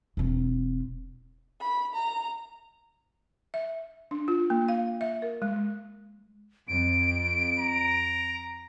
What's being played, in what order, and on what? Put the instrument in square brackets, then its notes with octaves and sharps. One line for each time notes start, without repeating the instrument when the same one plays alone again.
[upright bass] E1 C4
[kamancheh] B5
A#5
[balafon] E5
D4
F4
A#3
F5
E5
A#4
G#3
[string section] F2 [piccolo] D7
[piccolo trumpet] A#5